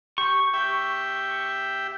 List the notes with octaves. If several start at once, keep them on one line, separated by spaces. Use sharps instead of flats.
G4 C#6
G4 E5 G5